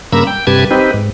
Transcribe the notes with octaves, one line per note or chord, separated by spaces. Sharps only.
G2 C#3 A#3 A#5 B5 E6
G5
G2 C3 G4 B4 A5 G#6
C4 D#4 G4 B4
G#2